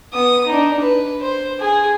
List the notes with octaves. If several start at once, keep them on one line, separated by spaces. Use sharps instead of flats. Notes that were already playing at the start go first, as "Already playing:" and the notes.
B3 D#6
D4 D#4
B4
C5
G#4